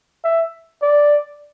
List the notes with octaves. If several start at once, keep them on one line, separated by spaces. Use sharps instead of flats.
E5
D5